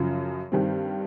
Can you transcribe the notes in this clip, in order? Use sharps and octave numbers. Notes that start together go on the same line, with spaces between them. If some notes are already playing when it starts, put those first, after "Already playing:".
Already playing: F#2 C#3 F3
G2 D#3 G3 C4